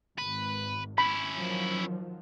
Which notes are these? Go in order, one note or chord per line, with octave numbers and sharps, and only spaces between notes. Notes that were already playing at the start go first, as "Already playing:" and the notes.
G#1 B4
C#4 E4 B5
D#3 F3 F#3